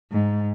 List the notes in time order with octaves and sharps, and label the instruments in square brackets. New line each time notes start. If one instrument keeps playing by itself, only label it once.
[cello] G#2